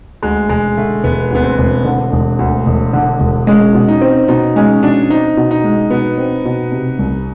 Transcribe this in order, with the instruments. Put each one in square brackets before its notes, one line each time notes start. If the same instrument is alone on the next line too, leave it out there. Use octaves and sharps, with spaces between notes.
[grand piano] D2 [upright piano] G#3
[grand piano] E1 [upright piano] G#3
[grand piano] D3 [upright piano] A3
[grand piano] E1 [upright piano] B3
[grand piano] D2 [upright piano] B3
[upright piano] C4
[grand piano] E1
D3
E1
D2
E1
D3
E1
[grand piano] G#3 [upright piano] C#4
[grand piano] B2
[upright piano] D#4
[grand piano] C4
[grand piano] B2 [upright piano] D#4
[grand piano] G#3 [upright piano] C#4
[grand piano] B2 [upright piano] D4
[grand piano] C4 [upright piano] D#4
[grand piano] B2
[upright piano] D#4
[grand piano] G#3
[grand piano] B2 [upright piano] B3
[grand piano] C4
B2
C3
C2